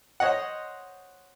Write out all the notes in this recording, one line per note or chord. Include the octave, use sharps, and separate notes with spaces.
C5 C#5 D#5 F#5